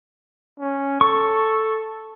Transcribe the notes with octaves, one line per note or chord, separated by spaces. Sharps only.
C#4
A4 C#6